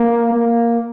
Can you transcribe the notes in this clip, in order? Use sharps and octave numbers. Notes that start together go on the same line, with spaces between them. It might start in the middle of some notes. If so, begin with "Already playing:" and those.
Already playing: A#3
A#3